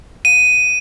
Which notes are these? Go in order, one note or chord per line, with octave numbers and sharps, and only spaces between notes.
D#7